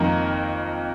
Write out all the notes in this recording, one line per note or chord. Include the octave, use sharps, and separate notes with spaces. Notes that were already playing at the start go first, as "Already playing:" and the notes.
Already playing: F2 D#3 A#3